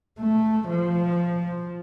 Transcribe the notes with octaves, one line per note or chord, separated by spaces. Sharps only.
A3
F3